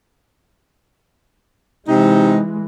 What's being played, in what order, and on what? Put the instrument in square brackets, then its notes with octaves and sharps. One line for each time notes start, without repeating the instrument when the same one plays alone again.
[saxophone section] C3 C4 D#4 [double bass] E3 G#3